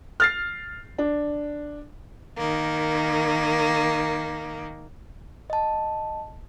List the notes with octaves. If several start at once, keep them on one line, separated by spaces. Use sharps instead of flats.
F6 A6 C7
D4
D#3 A#3
D#5 A5